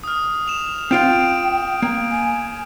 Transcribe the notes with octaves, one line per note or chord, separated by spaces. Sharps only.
D#6 F6
E7 F7
C4 F4 F5 G5 G6 D7
A#3
G#5